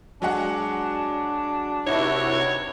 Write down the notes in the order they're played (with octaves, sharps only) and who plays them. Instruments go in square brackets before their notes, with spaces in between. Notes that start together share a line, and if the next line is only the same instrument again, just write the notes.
[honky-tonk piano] F#3 G#3 F#5 [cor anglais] D4
[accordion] C3 E4 F#4 [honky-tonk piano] D#4 [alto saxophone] C#5